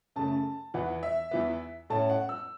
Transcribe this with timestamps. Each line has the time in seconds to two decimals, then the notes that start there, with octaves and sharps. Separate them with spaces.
0.16 F#2 C#3 A3 A5
0.74 E2 E3 B3 F#5
1.03 E5
1.31 E2 E3 B3
1.90 A2 A3 C#4 A5
2.10 F#5
2.29 E6